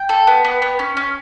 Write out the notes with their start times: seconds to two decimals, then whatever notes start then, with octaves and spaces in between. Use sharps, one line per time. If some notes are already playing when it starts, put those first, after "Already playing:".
Already playing: G5
0.09 A4
0.27 B3
0.44 B3
0.62 B3
0.79 C#4
0.97 C#4